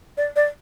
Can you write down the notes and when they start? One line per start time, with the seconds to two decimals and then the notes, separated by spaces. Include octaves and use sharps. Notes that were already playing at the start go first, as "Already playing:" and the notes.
0.17 D5
0.36 D5